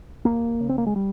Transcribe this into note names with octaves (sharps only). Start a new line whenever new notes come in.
D#2 A#3
C#3
C4
A#3
G#3
G3